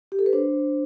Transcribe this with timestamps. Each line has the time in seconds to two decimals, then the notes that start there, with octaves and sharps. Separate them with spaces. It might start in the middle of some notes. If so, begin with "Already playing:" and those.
0.12 G4
0.19 A4
0.26 B4
0.33 D4 C5